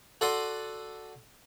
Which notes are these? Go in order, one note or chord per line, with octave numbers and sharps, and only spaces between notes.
F#4 A4 D5 F#5 C6 D#6